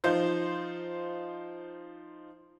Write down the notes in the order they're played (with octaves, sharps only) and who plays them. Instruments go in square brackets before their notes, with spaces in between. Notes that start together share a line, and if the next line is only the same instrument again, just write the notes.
[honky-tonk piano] F3 D#4 F4 C5 G6